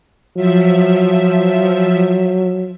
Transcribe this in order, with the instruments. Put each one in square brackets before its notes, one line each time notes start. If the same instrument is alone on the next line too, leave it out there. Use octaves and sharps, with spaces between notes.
[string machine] F3 E5 [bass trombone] F#3